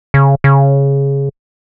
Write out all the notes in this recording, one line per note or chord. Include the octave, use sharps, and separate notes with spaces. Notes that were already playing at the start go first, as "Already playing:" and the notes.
C#3
C#3